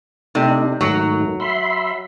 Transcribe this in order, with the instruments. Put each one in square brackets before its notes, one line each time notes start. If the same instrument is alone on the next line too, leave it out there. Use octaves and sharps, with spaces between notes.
[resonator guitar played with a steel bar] C3 [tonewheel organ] A3 D4 D#4
[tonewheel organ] G#2 D#3 A3 [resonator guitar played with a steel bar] F#3
[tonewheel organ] E5 B5 C6